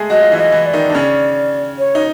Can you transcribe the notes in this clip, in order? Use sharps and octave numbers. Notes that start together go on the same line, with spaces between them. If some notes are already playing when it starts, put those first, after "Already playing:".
Already playing: G#3 A3 G#4
F#3 F#4 D#5
F4
E3 E4
D#5
E3 E4
D5
D#3 D#4
D4
C#3 C#4
C#5
D#4